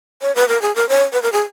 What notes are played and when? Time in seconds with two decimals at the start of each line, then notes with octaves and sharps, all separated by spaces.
0.22 C#5
0.36 B4
0.48 A#4
0.62 G#4
0.76 A#4
0.89 C#5
1.13 B4
1.23 A#4
1.32 G#4